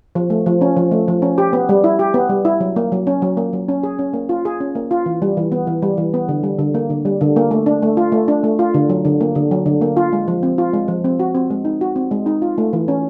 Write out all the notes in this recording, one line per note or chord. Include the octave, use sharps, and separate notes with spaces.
F3
A3
F3
C#4
F3
A3
F3
C#4
G4
B3
G3
E4
G4
B3
G3
E4
F#3
A#3
F#3
C#4
F#3
A#3
F#3
C#4
G#4
C#4
A#3
F4
G#4
C#4
A#3
F4
E3
G3
E3
B3
E3
G3
E3
B3
D3
G3
D3
A#3
D3
G3
D3
A#3
A3
D4
A3
F4
A3
D4
A3
F4
D3
F#3
D3
A#3
D3
F#3
D3
A#3
F4
G#3
F3
C4
F4
G#3
F3
C4
F#4
C4
G#3
D#4
F#4
C4
G#3
D#4
F4
A3
E3
C#4